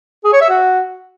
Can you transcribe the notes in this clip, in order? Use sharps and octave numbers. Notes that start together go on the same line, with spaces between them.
G#4
C#5
E5
F#4